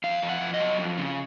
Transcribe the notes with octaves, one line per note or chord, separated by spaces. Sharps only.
F2 F5
F2
F#5
F2
D#5
F#3
F2
C#3